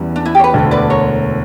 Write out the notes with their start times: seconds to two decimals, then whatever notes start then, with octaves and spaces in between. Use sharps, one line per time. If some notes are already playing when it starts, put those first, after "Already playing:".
Already playing: E2 C#3 E3 G3
0.16 D4
0.25 E4
0.35 G4
0.39 C#5
0.44 B4
0.53 E1 D2 D3
0.71 B4 D5
0.90 A#4 C#5